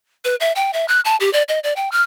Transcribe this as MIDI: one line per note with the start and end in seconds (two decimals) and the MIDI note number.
0.25 0.35 71
0.40 0.52 76
0.55 0.71 79
0.73 0.85 76
0.88 1.00 90
1.05 1.16 81
1.20 1.32 67
1.33 1.43 74
1.48 1.59 75
1.64 1.73 74
1.76 1.89 79
1.92 2.02 89